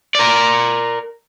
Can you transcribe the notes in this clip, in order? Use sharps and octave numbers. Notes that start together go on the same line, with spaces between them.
A#4 D5